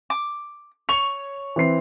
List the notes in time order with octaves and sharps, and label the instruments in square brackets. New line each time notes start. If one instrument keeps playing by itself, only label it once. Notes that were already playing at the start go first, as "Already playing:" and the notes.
[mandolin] D6
[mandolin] C#5 C#6 [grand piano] F7
[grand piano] E3 C4 C7